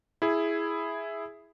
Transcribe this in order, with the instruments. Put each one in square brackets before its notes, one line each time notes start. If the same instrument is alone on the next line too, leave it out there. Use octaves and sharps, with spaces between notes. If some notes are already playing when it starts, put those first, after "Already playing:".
[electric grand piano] E4 G#4